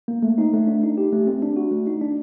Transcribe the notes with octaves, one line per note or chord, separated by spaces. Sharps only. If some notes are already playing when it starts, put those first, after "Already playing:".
A#3
A3
D#4
A3
D4
D#4
G4
A3
C4
D4
F#4
A3
D#4
D4